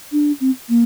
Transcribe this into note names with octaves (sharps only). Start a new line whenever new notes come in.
D4
C4
A#3